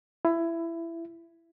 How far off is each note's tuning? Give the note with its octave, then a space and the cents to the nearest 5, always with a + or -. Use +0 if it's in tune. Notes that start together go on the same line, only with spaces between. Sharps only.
E4 +20